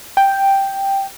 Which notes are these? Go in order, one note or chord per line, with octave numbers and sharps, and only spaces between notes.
G5